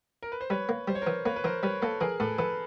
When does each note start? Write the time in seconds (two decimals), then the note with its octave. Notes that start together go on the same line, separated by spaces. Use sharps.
0.23 A#4
0.32 B4
0.41 C5
0.50 G3 B4 C#5
0.69 A#3
0.88 G3 C5
0.95 C#5
1.02 E3 A#4 C5
1.25 A#3 B4 C#5
1.36 B4
1.44 E3 A#4 C5
1.63 G3 B4 C#5
1.82 A#3 A4 B4
2.00 E3 G#4 A#4
2.20 A2 A4 B4
2.38 E3 A4 B4